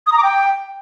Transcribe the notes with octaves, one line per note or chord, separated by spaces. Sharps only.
D#6
A#5
D6
G5